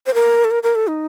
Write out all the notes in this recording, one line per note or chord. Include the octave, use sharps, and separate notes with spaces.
C5
A#4
A4
A#4
A#4
A4
D#4